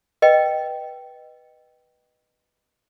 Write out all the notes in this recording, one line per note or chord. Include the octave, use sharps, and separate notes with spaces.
B4 D#5 G5